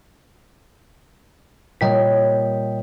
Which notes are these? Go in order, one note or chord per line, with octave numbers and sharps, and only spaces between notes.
A#2 G3 C#5 D#5 G5 B6